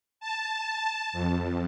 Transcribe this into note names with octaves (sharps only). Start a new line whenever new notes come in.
A5
F2